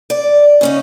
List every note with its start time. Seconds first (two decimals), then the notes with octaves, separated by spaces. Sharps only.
0.10 D5
0.61 C#3 C#4 D#4